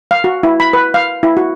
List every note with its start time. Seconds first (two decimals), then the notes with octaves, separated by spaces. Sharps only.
0.11 F5
0.24 F#4
0.43 E4
0.60 B5
0.73 B4
0.94 F5
1.23 E4
1.37 F#4